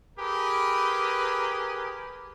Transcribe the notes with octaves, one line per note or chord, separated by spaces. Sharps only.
G4 G#4 A#4 B4